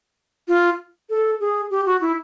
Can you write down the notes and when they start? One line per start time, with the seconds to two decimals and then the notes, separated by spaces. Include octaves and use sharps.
0.48 F4
1.10 A4
1.40 G#4
1.70 G4
1.86 F#4
2.01 E4